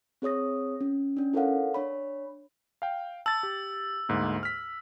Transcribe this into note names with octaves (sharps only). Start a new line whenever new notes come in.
C4 G#4 C#5 D#6 A#6
C#4
C#4 D4
E4 A4 A#4 C#5 F5 F#5
D4 C#5 B5
F5 G5
A5 E6 A6
G4
D2 G#2 A#3
F6 B6